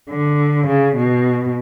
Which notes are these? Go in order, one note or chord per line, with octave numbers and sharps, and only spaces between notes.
D3
C#3
B2